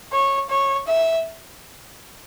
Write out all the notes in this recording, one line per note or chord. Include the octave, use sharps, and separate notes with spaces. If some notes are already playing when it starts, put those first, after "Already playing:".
C#5
C#5
E5